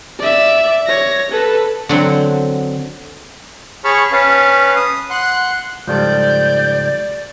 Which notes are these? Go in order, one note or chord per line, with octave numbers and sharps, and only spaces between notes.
D5 E5
C#5 A#6
A4 B4
D3 F#3 C4
G#4 C#5 A5 B5 C#6 F6
C#4 B4 C#5 F5 A5
D#6
F#5 C6 F#6
C#2 G#2 F3 G3 A4 D5 G6